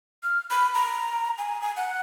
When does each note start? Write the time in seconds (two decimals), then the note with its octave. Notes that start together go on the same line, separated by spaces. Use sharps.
0.23 F6
0.51 B5
0.75 A#5
1.38 G#5
1.62 G#5
1.77 F#5